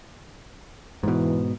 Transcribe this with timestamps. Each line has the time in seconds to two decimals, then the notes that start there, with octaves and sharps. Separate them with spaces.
1.03 G#2 B2 E3